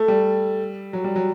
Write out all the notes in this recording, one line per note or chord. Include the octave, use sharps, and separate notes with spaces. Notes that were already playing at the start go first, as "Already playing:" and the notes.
Already playing: A3
G3
F#3
G3
F#3